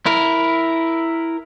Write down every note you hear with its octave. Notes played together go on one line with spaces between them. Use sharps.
E4 A#4